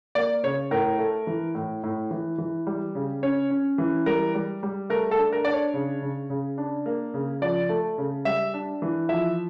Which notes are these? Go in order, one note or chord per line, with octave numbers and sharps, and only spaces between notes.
A#3 D5
C#3 C#5
A2 A#4
A3
E3
A2
A2
E3
E3
G3
C#3
C#4 C#5
C#4
E3
G3 A#4
G3
G3
A3 A#4
A4
D4
A#4
D4 D5
C#5
C#3
C#3
C#3
D4
A#3
C#3
F3 D5
A3
C#3
G3 E5
D4
E3
F3 E5